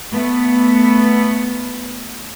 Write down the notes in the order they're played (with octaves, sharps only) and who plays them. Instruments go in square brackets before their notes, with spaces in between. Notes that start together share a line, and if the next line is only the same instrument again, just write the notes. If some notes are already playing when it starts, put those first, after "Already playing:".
[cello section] A3 B3